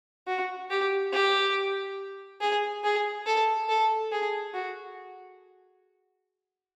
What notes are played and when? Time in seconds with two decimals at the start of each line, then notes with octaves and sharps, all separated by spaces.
0.27 F#4
0.70 G4
1.13 G4
2.41 G#4
2.84 G#4
3.26 A4
3.69 A4
4.12 G#4
4.54 F#4